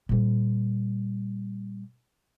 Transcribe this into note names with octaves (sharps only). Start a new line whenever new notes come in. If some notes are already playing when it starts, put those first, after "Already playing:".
A#2 G3